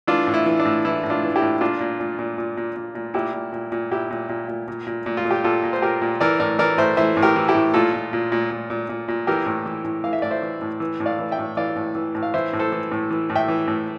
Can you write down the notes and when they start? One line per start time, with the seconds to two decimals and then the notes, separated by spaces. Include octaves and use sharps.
0.07 E3 D4 F4
0.27 A2
0.34 E4
0.46 E3
0.60 D4
0.65 A2
0.85 E3 E4
1.03 A2
1.10 D4 F4
1.23 E3
1.35 E4 G4
1.42 A2
1.61 A#2 D4 F4
1.80 A#2
2.00 A#2
2.19 A#2
2.38 A#2
2.57 A#2
2.76 A#2
2.95 A#2
3.14 A#2 E4 G4
3.34 A#2
3.53 A#2
3.72 A#2
3.91 A#2 E4 G4
4.10 A#2
4.29 A#2
4.48 A#2
4.68 A#2
4.87 A#2
5.06 A#2
5.17 F4
5.25 A#2
5.31 G4
5.44 A#2 F4 A4
5.63 A#2
5.73 C5
5.82 A#2 G4 A#4
6.02 A#2
6.21 E3 A#4 D5
6.40 A2 A#4 D5
6.59 E3 A#4 D5
6.78 A2 C5 E5
6.97 E3 C5 E5
7.17 A2
7.22 G4 A#4
7.36 E3
7.48 E4 G4
7.55 A2
7.74 A#2 F4 A4
7.93 A#2
8.13 A#2
8.32 A#2
8.51 A#2
8.70 A#2
8.89 A#2
9.08 A#2
9.27 E3 G4 A#4
9.46 A2
9.66 E3
9.84 A2
10.04 E3 F5
10.13 E5
10.22 A2 D5
10.31 C5 E5
10.42 E3
10.61 A2
10.80 E3
11.00 A2
11.06 D5 F5
11.19 E3
11.31 E5 G5
11.39 A2
11.57 E3 D5 F5
11.76 A2
11.95 E3
12.15 A2
12.23 F5
12.34 E3 C5 E5
12.53 A2
12.59 A4 C5
12.72 E3
12.92 A2
13.11 E3
13.30 A2
13.36 E5 G5
13.48 E3
13.68 A2